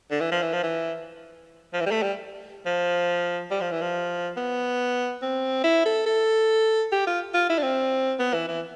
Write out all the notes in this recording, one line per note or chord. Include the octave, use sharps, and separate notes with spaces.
D3
E3
F3
E3
F3
E3
F3
E3
G3
A3
G3
F3
G3
F3
E3
F3
B3
C4
E4
A4
A4
G4
F4
F4
E4
D4
C4
B3
E3
E3